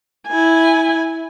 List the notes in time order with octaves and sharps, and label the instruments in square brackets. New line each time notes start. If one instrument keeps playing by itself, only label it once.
[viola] E4 G#5